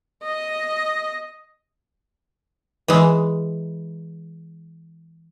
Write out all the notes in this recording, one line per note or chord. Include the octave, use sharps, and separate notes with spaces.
D#5
E3 G#3